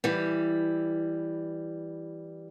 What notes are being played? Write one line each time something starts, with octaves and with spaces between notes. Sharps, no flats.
E3 G3